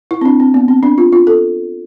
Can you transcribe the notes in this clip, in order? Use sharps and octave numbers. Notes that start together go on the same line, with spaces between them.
E4
C4
D4
C4
B3
C4
D4
F4
F4
A4